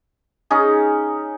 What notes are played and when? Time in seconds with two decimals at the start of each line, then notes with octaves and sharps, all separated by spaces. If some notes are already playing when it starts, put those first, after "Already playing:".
0.50 C#4 D#4 G#4